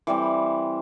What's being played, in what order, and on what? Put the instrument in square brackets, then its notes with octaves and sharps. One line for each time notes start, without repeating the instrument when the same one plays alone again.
[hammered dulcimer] E3 G3 C4